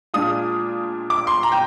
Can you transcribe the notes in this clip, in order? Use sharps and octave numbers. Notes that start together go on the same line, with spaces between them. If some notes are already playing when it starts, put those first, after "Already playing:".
A#2 G#3 D4 F4 D#6
D6
C6
A#5
G5